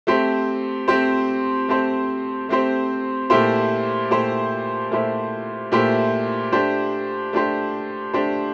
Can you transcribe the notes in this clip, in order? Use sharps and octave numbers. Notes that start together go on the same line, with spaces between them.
A3 C4 G4 C5
A3 C4 G4 C5
A3 C4 G4 C5
A3 C4 G4 C5
A#2 A3 E4 G4 C5
A#2 A3 E4 G4 C5
A#2 A3 E4 G4 C5
A#2 A3 E4 G4 C5
A3 D4 G4 C5
A3 D4 G4 C5
A3 D4 G4 C5